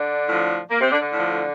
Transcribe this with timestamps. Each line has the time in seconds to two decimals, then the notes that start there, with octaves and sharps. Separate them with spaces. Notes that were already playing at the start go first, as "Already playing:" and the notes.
Already playing: D3 D4
0.28 A2 F3
0.70 A#3
0.81 C3 C4
0.91 D3 D4
1.01 D3 D4
1.12 A2
1.17 F3